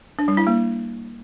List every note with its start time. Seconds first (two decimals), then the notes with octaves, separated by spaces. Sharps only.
0.19 D4
0.28 G3
0.37 E4
0.47 A#3